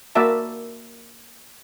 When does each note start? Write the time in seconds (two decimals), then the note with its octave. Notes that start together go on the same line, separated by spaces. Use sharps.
0.15 A#3 F#4 A#4 D5 E5 A5